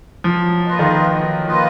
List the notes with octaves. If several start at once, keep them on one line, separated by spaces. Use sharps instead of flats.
F3 F#3
A#3 F4 B4 D#5
D#3
F#3
A#3 F4 B4 D#5